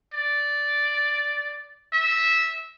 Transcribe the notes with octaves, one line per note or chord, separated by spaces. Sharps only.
D5
E5